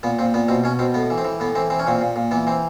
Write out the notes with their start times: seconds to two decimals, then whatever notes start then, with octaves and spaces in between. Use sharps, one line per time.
0.03 A#2 B3
0.19 A#2 C4
0.34 A#2 B3
0.48 B2 C4
0.64 B2 C#4
0.79 B2 C4
0.94 A2 B3
1.10 E3
1.18 C4
1.25 E3
1.40 A2 B3
1.55 E3 C4
1.70 E3 C4
1.79 C#4
1.87 A#2 C4
2.01 A#2
2.16 A#2
2.31 E3 B3
2.47 E3 C4